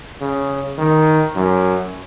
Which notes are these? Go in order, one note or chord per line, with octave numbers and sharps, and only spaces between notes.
C#3
D#3
F#2